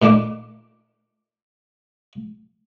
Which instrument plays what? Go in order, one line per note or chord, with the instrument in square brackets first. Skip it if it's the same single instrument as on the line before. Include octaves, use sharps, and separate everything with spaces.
[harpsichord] A#2 D#3 A3 D4 D6